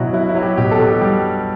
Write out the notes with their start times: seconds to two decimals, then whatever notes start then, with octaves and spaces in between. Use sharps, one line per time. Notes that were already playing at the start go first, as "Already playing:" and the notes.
Already playing: B2 F#3 E4 F#4
0.13 F#3 E4
0.29 E4
0.35 F#3
0.42 G4
0.57 B2 G4
0.71 A4
0.79 B2
0.87 G4
1.01 G3 G4